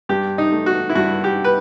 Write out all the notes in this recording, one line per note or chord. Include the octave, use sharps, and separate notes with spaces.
G2 G4
D#4
A3
F#4
E4
G2 F#4
G4
B4